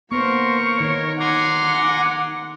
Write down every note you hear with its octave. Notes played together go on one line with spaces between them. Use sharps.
A#3 B3 A#4 C5 C#6
D#3 C#5
F#5 G#5 A#5 C6 D6